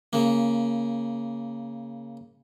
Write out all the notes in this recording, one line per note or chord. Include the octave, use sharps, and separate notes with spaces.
C#3 A#3